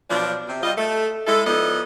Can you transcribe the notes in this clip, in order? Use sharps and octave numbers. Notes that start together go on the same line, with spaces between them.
B2 F3 F#3 D4
C3
G3 F4 D#5
A3
G#3 E4 A4
F3 B3 D#4 A4 D5 D#5